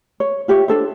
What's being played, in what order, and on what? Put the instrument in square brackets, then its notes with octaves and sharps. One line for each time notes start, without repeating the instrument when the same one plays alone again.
[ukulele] C#5
F4 G4 C#5 E5
D4 A4 C5